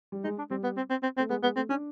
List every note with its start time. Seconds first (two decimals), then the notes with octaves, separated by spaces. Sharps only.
0.12 G3
0.24 G#3 D#4
0.38 D4
0.50 G3 C4
0.63 B3
0.77 C4
0.90 C4
1.03 C4
1.17 A3 C4
1.30 G#3 B3
1.43 G#3 B3
1.56 A3 C4
1.69 C#4 D4